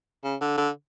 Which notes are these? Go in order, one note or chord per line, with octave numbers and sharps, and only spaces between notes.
C#3
D3
D3